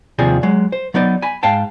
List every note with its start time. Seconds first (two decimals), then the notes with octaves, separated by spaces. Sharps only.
0.19 D#2 C3 F3 G#4 D5
0.43 F#3 G#3
0.72 C5
0.94 F#3 B3 D#4 D5
1.22 G#5 B5
1.43 G#2 F5 G5 A5